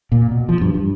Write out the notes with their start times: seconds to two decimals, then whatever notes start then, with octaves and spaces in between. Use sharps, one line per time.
0.12 A#2
0.31 B2
0.49 F3
0.61 G2
0.74 G2